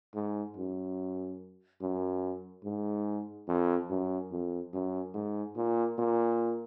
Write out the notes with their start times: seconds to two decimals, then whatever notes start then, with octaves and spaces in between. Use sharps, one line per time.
0.15 G#2
0.57 F#2
1.82 F#2
2.64 G#2
3.48 F2
3.90 F#2
4.32 F2
4.73 F#2
5.14 G#2
5.56 A#2
5.99 A#2